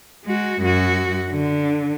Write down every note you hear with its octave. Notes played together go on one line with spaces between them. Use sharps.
G#3 F#4
F#2 F#4
D3